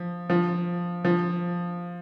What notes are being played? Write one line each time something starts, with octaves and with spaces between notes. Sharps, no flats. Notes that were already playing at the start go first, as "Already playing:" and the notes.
Already playing: F3
F3
F3